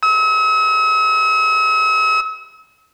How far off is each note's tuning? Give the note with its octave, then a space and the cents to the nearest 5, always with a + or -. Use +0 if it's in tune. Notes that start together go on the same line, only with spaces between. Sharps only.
E6 -45